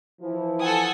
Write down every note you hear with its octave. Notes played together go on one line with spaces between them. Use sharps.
E3 F3 E4
A4 F#5 G#5 D#6